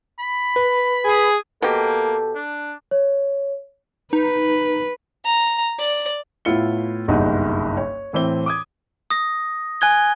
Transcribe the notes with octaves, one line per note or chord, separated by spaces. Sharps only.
B5
B4
G#4
B2 A#3 G4 A4
D4
C#5
D#4 B4
A#5
D5
A2 B3 E4 F4 C#7 G7
F#1 B1 G2 D#4 F#5
C#5
A2 E3 C4 G7
D6 D#6 G#6
D#6 A#6
G#5 F#6 G#6 G7